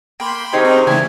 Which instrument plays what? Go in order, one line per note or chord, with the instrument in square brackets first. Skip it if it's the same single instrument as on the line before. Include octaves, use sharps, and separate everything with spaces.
[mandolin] A#3 [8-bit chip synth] G5 B5 C6
[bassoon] C3 [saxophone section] D#3 D#4 [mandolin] C#4 G#4
[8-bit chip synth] C4
[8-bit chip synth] C#3 E3 A3 [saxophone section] C#4 D4 E4 [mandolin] G#5